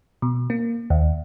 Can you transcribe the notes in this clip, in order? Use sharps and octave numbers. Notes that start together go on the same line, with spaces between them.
B2
A#3
D#2